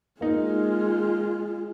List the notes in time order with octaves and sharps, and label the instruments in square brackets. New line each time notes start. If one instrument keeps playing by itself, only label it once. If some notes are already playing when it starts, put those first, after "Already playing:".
[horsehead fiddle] G#3 F4 [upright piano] A#3 D#4